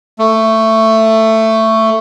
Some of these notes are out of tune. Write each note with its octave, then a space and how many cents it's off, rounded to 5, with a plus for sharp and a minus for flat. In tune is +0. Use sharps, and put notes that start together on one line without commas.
A3 +15